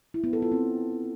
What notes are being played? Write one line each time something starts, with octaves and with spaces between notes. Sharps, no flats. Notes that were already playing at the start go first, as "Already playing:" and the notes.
E4
B3
A4
F4
C4